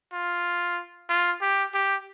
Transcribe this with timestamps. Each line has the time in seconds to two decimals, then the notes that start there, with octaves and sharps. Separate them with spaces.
0.13 F4
1.10 F4
1.42 G4
1.74 G4